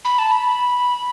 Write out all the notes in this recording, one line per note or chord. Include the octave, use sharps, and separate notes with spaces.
B5
A5
B5